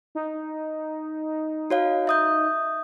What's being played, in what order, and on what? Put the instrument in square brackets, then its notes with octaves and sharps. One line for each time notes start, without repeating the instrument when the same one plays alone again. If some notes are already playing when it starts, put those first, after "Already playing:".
[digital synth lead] D#4
[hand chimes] F#4 C#5 F5
E5 D#6 G6